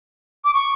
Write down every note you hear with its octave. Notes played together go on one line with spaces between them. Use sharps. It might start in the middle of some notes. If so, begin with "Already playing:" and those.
D6
C#6